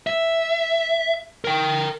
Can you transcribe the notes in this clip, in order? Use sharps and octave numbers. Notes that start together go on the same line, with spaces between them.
E5
A#4 G5